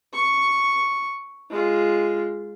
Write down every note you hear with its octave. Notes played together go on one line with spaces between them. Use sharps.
C#6
G#3 F4